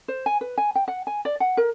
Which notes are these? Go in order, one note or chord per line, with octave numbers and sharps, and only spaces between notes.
C5
G#5
B4
G#5
G5
F#5
G#5
D5
F#5
A#4